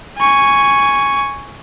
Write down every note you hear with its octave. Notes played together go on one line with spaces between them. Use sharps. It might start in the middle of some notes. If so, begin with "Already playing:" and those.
G#5 C#6